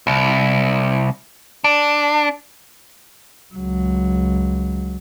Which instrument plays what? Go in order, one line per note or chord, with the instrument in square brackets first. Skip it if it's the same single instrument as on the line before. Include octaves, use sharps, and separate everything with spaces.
[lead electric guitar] C2
D4
[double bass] C#2 F#3